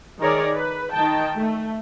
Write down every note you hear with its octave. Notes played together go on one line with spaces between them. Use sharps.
D#3 G#4 A#4 C#5 D5
B4
D#3 G5 A5
A3